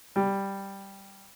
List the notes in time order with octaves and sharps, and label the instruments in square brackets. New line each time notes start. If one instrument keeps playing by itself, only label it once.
[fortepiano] G3